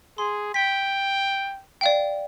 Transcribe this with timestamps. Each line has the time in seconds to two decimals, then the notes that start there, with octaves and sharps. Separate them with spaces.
0.18 G#4 C6
0.54 G5 B6
1.81 D5 F5 G5